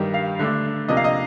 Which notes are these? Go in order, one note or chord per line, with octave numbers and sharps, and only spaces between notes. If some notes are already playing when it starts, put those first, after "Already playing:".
Already playing: G2 D#3 G3
F5
D3 A3 D4
C3 F3 A#3 D4 D#5
F5
D#5